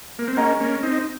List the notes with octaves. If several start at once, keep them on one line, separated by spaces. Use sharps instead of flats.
A#3
C4
A#3 C#4 G#4 D#5 F#5 A#5
A#3 C#4
C4 D#4